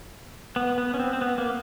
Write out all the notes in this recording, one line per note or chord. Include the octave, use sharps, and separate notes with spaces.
B3
B3
C#4
C4
C4
B3
A#3